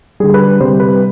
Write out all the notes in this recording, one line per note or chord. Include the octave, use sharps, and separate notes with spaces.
D3 G3 G#4
B4
C3 G3 C5
B4